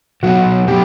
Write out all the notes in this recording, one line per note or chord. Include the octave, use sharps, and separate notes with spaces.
B2 F#3 B3 D#4 F#4
B2 F#3 B3 D#4 G4